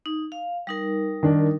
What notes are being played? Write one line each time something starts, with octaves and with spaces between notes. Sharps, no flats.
D#4
F5
G3 D#4 A#4
D#3 D4